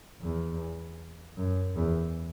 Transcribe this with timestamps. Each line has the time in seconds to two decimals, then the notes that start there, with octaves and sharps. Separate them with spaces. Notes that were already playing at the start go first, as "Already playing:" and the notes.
0.21 E2
1.37 F#2
1.75 E2